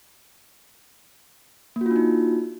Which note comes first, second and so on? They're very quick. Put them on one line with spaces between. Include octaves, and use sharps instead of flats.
A#3 F#4 F4 D4 D#4